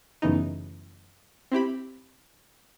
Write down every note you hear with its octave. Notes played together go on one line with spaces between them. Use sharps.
F#2 A2 C#3 E3 B3 D#4
C4 E4 G4 B5